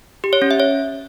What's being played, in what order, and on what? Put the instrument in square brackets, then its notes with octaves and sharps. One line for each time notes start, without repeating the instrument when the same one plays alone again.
[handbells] G4
C#5
C#4
E5
C#5